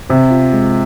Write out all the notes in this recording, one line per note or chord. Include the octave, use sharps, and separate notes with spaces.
C3 C4
F4
G#3